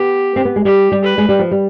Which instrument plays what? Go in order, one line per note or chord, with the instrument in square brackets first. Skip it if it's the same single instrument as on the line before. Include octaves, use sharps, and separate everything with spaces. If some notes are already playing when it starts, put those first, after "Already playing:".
Already playing: [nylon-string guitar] B3 [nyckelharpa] G4
[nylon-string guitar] C4
B3
G#3
[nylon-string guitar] G3 [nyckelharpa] G4
[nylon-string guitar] G3
[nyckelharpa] B4
[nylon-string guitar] G#3
G3
F3
G3